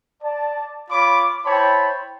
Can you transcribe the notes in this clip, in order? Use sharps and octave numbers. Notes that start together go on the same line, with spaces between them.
D5 A5
F4 C#5 B5 D6
E4 C5 C#5 G5 A5 B5